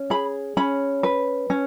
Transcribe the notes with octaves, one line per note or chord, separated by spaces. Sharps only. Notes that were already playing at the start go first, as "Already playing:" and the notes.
Already playing: C#4
G#4 B5
C#4 B5
B4
C#4